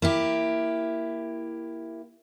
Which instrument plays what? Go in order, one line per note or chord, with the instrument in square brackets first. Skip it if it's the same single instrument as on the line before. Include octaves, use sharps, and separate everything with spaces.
[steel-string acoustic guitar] A#3 E4 G4